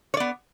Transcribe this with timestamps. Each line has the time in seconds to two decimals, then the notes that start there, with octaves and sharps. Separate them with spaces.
0.14 C#5
0.17 D5
0.20 B3